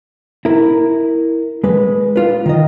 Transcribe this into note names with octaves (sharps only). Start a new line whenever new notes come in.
E4 A#4
G#3 B4
F4 B4
D#3 D#5